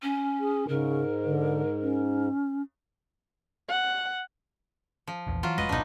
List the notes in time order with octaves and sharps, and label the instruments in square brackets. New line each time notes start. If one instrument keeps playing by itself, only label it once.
[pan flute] C#4
[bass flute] G#4
[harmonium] G#2 [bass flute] C#3 [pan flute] A#4
[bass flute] D3
C#4
[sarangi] F#5
[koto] F3
[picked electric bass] A#1 E2
[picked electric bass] E3 [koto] F#3 F4
[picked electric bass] F1 F2 G#3 [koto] B4 D#5
[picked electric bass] D1 G#1 B2 [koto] D4 D#4